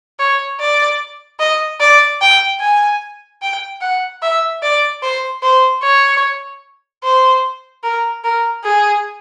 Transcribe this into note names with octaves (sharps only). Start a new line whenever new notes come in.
C#5
D5
D#5
D5
G5
G#5
G5
F#5
E5
D5
C5
C5
C#5
C5
A#4
A#4
G#4